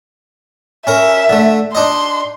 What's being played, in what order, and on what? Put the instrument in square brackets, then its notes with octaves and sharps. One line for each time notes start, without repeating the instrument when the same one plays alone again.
[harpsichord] C#4 A#4 [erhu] E5
[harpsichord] D3 A3
[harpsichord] D4 D#4 D#5 [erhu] C6